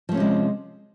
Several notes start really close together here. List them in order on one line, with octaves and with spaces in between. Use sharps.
F3 A3 C#4 C3 G#3